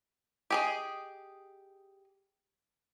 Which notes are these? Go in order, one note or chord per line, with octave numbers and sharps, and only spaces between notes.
G4 G#4 D#5